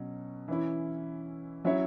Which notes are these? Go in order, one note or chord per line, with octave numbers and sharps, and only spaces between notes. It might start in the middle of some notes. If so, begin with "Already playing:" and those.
Already playing: B2 F#3 C#4
E3 C#4 E4
F#3 C#4 E4 C#5 E5